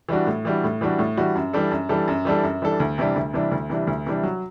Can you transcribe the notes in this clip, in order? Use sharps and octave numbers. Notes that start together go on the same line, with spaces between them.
E3 G3 D4 F#4
A2
E3 G3 D4 F#4
A2
E3 G3 D4 F#4
A2
E3 G3 D4 F#4
F#2
E3 G3 D4 A4
F#2
E3 G3 D4 A4
F#2
E3 G3 D4 A4
F#2
E3 G3 D4 A4
D2
C3 E3 G3 D4
D2
C3 E3 G3 D4
D2
C3 E3 G3 D4
D2
C3 E3 G3 D4
F#3